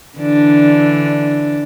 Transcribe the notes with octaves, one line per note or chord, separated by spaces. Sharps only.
D3 E3 D4